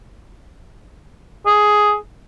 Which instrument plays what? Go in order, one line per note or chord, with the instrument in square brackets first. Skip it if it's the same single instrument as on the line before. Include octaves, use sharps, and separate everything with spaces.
[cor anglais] G#4